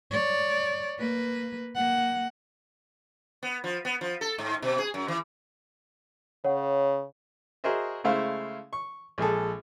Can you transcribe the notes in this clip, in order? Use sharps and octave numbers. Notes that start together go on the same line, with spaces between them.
C#5 D5
A#3 B4
A#3 F#5
B3
F3
B3
F3
A4
G#2
B2
G#4
F#2
E3
C#3 C#5 F#5
F#4 G#4 A#4 C5 D#5 E5
C#3 G#3 A3 E4 C5 F5
C#6
A#1 G#3 G#4 A4